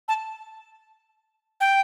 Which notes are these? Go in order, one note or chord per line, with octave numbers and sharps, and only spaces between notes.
A5
G5